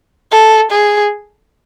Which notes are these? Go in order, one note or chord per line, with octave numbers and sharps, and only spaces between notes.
A4
G#4